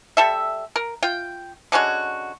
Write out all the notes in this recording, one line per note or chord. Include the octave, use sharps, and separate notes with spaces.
G3 A4 E5
A#4
F4 G5
D3 G#3 C#4 F#4